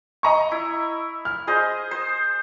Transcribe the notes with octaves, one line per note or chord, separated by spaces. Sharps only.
D#5 A#5 C#6
E4
F6
G#4 C5 D#5
C5